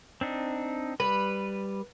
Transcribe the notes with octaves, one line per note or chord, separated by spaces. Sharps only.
C4 D4 D#4
G3 B4